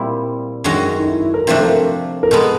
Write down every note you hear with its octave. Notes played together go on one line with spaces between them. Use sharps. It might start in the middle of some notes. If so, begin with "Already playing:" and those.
Already playing: A#2 G3 C4 E4
F#2 D#3 G#3 C#4 D4 F#4
D#4
E4
E4
A#4
C3 F3 A3 D4 A#4
A#4
A#4
B2 G#3 B3 A4